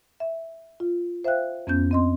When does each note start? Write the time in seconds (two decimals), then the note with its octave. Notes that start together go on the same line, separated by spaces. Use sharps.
0.20 E5
0.80 F4
1.24 C5 E5 F5 G5 F#6
1.67 F2 B3 C#4 G6
1.91 C4 D#5 C6